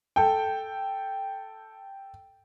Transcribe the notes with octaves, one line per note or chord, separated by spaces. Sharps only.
A4 G5